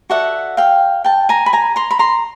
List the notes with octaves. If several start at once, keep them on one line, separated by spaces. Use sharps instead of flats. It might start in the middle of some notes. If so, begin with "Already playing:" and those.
F#4 A4 D5 E5 F#5
F5 G5
G5 A5
G#5 A#5
B5
G#5 A#5
A#5 C6
B5
A#5 C6